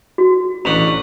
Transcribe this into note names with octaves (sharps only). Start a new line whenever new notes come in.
F#4
A1 D4 F#5 A#5 C#6 B6 F7